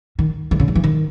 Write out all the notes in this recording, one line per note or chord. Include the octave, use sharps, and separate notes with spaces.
D#3
D#3
C#3
D#3
E3
D#3